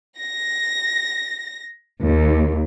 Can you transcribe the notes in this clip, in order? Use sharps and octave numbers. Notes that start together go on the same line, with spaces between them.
A#6
D#2